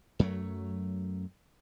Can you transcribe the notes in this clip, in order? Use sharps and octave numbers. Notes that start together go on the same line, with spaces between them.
F#2 F#3 A3